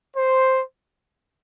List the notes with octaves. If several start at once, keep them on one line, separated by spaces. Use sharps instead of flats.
C5